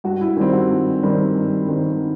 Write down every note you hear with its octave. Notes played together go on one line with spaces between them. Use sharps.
G2 F#4
E4
D#3 G3 C4 E4
F#4
G2
D#3 G3 C4
G2
D#3 G3 C4